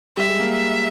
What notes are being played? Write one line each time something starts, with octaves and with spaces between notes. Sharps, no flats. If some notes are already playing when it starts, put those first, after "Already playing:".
G3 E5
G#3
A#3
E5